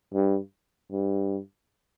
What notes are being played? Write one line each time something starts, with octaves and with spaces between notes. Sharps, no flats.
G2
G2